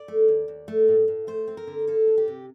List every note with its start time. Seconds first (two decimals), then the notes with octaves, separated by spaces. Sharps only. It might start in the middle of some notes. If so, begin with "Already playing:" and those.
Already playing: D5
0.08 A3
0.28 D#2
0.48 D#2
0.68 A3
0.88 A2
1.08 A2
1.27 A3 C5
1.48 C4
1.57 A#4
1.67 D3
1.87 A#3 A4
2.07 D4
2.18 G4
2.28 C3